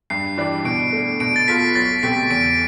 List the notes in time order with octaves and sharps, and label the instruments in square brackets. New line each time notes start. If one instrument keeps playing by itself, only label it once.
[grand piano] G2 [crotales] C7
[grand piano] E3 G3 D4
[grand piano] B2 [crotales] D7
[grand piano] A3 D4
[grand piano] B2 [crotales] D7
[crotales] A6
[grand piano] B3 F4 A4 [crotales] B6
[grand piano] B1 [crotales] A6
[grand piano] B2 A3 C4 G4 [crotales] B6
[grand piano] E2 [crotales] D7